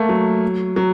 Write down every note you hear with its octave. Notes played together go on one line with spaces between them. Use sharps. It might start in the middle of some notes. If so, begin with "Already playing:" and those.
Already playing: A3 A#3
F#3
F#3